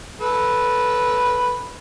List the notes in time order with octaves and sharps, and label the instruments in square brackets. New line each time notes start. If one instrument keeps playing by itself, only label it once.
[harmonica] A4 B4